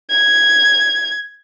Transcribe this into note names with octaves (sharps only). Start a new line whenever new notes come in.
G#6